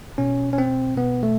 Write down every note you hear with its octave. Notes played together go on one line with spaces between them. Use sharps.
B2 C#4
C#4
C4
B2 B3
A3